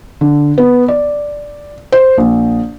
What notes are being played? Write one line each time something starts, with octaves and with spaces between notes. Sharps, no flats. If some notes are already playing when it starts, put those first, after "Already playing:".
D3
B3
D5
C5
A#1